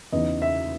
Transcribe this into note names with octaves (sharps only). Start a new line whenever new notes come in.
E2 C#3 E3 B3 D#4 D#5
E5